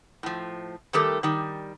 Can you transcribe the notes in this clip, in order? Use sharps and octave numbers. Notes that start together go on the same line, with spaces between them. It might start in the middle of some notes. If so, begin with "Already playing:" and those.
A2 F3
D#3 G3 A3 G4 A4 A#4
D#3 G3